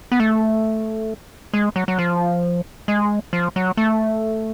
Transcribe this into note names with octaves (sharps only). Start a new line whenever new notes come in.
B3
A3
G#3
F#3
F#3
F3
G#3
F3
F#3
A3